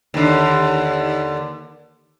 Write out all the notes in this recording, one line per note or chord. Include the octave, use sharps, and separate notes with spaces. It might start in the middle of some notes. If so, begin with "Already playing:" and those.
D#2 D3